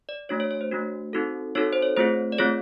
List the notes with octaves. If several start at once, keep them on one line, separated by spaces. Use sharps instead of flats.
D5
A3 D4 F#4 C#5
C#5
C#5
C5
A3 D4 F#4
C4 D#4 F#4 A4
C4 D#4 F#4 A4 C#5
C5
C#5
A3 C4 F4 G#4 C5
D5
A3 C4 F4 G#4 C#5